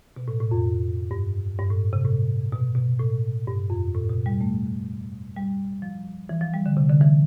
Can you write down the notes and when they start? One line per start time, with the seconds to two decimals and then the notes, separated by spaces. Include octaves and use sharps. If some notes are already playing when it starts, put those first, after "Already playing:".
0.16 B2
0.28 A2
0.40 A2
0.51 F2
1.11 G2
1.59 G2
1.70 A2
1.93 C3
2.05 A2
2.52 B2
2.76 B2
2.99 A2
3.47 G2
3.70 F2
3.94 A2
4.09 B2
4.26 G3
4.41 A3
5.36 G3
5.82 F3
6.29 E3
6.41 F3
6.54 G3
6.66 D3
6.77 C3
6.89 D3
7.01 E3